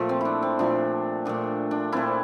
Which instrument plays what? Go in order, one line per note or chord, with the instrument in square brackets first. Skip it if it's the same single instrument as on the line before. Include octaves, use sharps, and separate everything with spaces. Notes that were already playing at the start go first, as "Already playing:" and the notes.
Already playing: [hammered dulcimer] A#2 F3 A3
C4
D4 E4
C4
A#2 F3 A3 D4
A#2 A3 D4
D4
A#2 A3 C4 E4